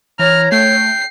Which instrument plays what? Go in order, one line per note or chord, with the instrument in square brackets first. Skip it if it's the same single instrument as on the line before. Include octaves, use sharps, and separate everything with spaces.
[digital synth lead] E3 [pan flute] C#5 [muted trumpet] A#5 [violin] F6
[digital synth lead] A3 [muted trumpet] G5 [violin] C7